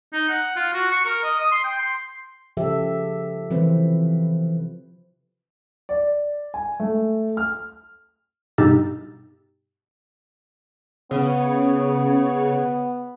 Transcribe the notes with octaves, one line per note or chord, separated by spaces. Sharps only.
D#4
F#5
F4
F#4
C#6
A#4
D#5
D#6
C6
G5
C6
C#3 F3 G4 A4 E5
C3 E3 F3 C4 B4 C5
D5
G#5
A3
F6
G2 B2 D#4 G4 E6 A6
C#3 B3